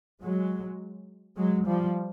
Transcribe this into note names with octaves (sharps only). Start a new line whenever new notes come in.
F#3 G#3
F#3 G#3
F3 G3